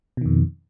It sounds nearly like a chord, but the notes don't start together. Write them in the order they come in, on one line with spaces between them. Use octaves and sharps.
B2 D#3 F2